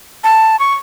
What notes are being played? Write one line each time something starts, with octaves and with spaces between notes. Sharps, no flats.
A5
C#6